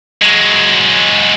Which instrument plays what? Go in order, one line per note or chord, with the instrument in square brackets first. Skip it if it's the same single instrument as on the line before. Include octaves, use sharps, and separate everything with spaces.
[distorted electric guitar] F#3 G#3